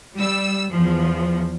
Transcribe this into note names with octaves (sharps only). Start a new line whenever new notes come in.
G3 E6
E2 F3